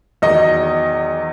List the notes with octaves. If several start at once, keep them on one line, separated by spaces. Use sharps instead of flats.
E2 D#3 F#3 D#4 D#5